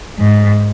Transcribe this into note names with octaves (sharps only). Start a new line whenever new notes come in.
G#2